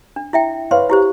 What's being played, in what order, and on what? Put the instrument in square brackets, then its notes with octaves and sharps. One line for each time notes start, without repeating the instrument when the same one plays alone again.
[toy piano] D4
E4 E5 G5
[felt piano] B4 C#5 F5 [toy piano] C6
[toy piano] E4 G4 C5